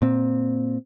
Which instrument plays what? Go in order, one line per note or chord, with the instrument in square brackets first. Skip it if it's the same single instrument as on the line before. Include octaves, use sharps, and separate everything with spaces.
[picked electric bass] A#2 C4